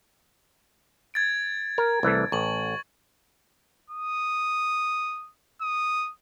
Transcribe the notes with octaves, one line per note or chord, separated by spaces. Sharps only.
G#6 A6 D7
A#4
C2 E3 A3
A1 C#6 F#7
D#6
D#6